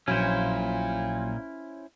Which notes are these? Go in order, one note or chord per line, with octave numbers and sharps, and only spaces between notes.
A#1 A#2 F#3 C#4 E4 C5